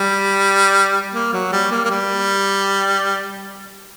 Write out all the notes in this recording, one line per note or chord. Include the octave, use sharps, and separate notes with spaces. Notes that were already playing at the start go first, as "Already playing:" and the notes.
Already playing: G3
A#3
F#3
G3
A#3
A#3
G3